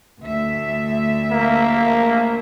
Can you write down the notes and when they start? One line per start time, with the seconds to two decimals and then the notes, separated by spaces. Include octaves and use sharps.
0.21 D2 E5
1.31 A#3